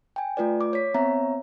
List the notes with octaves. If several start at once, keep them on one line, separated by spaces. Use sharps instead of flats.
G5 G#5
A3 F4 B4 D5
D6
C#5 B6
B3 C4 C#5 E5 A#5